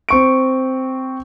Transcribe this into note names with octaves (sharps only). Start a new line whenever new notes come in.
C4 C#6 D7